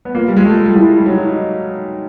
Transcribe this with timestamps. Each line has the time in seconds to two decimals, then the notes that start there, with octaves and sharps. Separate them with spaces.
0.05 B3
0.15 A#3 F4
0.28 G3
0.36 G#3
0.44 A3 F4
0.66 G3
0.75 G#3 E4
0.96 G3
1.06 F#3 D#4
1.18 E4
1.28 D#4